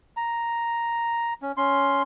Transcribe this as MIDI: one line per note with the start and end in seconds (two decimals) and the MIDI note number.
0.17 1.33 82
1.42 1.52 61
1.57 2.02 61
1.57 2.02 84